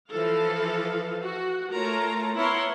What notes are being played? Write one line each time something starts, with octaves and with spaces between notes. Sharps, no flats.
E3 F3 A4 F5
F#4
A3 F4 A#4 C#5 A5 A#5
B3 E4 A#4 C#5 C6